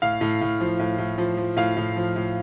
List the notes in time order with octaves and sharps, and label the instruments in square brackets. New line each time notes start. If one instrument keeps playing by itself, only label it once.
[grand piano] A2 F5
A2
A2
F3
A2
A2
F3
F3
A2 F5
A2
F3
A2